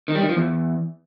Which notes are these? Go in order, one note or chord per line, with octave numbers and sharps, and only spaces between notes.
D#3
G3
D#3
F3
E2